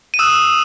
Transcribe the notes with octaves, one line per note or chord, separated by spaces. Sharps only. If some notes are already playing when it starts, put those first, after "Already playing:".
D#7
D#6 E6 F#6 E7